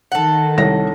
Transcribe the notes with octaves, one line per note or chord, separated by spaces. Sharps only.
D#3 A4 F#5
C2 C#5 A#6